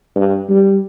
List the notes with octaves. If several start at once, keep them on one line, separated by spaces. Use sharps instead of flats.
G2
G3